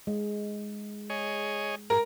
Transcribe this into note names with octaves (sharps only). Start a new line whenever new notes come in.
G#3
G#4 C#5 D#5
G#2 A#4